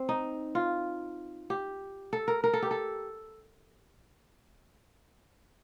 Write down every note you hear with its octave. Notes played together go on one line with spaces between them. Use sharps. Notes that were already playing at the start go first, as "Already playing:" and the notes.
Already playing: C4
D#4
F4
G4
A4
A#4
A#4
A4
G4
A4